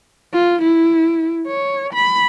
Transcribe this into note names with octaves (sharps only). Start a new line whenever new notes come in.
F4
E4
C#5
B5